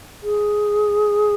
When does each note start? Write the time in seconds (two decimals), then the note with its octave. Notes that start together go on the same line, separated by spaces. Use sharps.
0.23 G#4